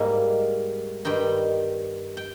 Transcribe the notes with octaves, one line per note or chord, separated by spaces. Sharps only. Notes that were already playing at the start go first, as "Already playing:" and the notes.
Already playing: G#2 G3 A#3 G#5
G2 D#3 G3 G5
G5